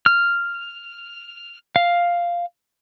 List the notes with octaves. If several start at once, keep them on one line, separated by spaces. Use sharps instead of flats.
F6
F5